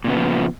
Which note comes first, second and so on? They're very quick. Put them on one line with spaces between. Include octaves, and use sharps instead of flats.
A#2 C#3 B3 E3 F3